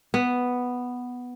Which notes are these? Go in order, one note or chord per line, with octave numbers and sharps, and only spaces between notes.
B3